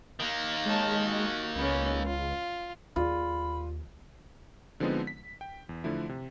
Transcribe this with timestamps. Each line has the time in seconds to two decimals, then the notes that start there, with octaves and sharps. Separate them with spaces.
0.20 D#3 A#3
0.66 G#3 C#5 A5
1.03 F#4
1.55 C#2 B3 C#4
2.06 F4
2.96 D#2 F4 G#4 D5 B5
4.80 D3 F3 G#3 B3 C4 D#4
5.07 B6
5.41 G5
5.69 E2
5.84 D3 F3 A3 E4
6.09 C3